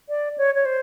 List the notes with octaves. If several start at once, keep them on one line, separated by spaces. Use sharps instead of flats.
D5
C#5
C#5
C5